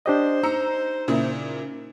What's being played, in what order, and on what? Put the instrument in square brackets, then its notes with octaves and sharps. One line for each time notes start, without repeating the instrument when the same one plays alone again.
[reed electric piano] D4 G4 D#5 [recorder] C5
[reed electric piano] D#4 [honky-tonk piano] A#5 E6 C#7
[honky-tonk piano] A#2 C#3 E4